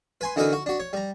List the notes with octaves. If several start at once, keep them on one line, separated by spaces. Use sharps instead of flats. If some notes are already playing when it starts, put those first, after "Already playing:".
B4 G#5 C6
D3 E3 D#4 F#4 A#4 B4
F#4
D4 F#4
C#5
G3 A#5